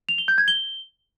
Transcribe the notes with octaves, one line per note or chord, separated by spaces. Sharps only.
F7
G7
G6
G#6
G7